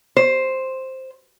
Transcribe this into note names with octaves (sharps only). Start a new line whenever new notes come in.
C5